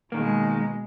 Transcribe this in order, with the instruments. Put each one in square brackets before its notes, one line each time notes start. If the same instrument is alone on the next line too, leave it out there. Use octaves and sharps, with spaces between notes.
[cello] B2 G#3 [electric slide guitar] D#3 A#3